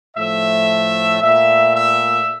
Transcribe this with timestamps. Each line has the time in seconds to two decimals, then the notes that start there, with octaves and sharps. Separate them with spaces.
0.16 A2 F3 A3 E5
1.21 A#2 A3 E5
1.74 E5